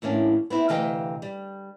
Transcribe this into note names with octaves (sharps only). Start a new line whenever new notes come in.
E2 A2 A#3 C#4 D4
B3 C4 E4
D2 C3 E3 D#5 F5 G5
G3